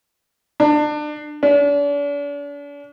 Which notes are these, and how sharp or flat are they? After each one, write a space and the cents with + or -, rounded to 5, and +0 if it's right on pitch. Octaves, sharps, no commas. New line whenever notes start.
D4 +30
D4 -40